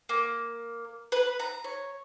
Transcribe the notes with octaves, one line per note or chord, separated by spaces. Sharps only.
A#3
B4
A#5
C#5